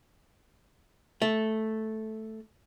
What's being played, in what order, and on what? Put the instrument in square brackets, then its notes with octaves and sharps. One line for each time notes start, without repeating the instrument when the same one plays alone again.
[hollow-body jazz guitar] A3